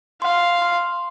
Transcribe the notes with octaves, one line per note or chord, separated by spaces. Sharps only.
F5 C6
C6